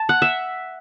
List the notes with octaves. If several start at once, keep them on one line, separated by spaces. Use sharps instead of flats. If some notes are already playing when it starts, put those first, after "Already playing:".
Already playing: A5
F#5
E5